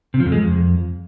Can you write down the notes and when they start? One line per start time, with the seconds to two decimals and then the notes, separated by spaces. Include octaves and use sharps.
0.14 C3
0.20 F3
0.26 F2
0.32 G#3
0.38 F2